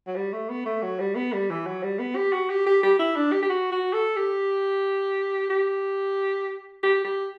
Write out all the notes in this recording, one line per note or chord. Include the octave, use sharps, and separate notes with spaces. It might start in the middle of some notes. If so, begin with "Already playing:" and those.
F#3
G3
A3
B3
A3
F#3
G3
B3
G3
E3
F#3
G3
B3
G4
F#4
G4
G4
G4
E4
D4
G4
G4
F#4
F#4
A4
G4
G4
G4
G4